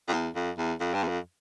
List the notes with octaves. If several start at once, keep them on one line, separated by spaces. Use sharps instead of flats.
F2
E2
F2
E2
F2
G2
E2
F2